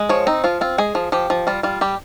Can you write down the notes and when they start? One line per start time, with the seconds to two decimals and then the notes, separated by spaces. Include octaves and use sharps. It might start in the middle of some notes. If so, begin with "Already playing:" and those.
Already playing: G#3
0.09 F3 C#5
0.27 C4 D#4
0.44 F3 F4
0.61 C4 F4
0.78 G#3 G#4
0.95 F3
1.12 F3 G4
1.30 F3
1.47 G3 F4
1.63 G3 F4
1.81 G3 G4